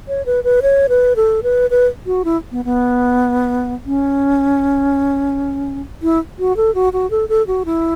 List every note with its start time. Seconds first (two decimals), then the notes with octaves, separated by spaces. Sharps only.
0.08 C#5
0.26 B4
0.44 B4
0.62 C#5
0.89 B4
1.16 A4
1.43 B4
1.70 B4
2.06 F#4
2.25 E4
2.52 B3
2.65 B3
3.86 C#4
6.03 E4
6.39 F#4
6.57 A4
6.75 F#4
6.93 F#4
7.11 A4
7.29 A4
7.47 F#4
7.65 E4